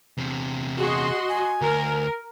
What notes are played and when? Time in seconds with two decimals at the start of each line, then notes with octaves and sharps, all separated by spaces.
0.17 E2 C3
0.78 F#4 G#4 D#5 C6
1.28 G#5
1.62 D2 A#4